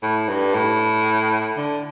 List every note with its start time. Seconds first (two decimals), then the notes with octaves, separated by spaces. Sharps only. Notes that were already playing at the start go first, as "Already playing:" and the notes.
0.03 A2
0.28 G2
0.54 A2
1.57 D3